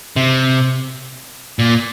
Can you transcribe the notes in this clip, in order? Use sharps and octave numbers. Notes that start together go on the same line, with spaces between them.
C3
A#2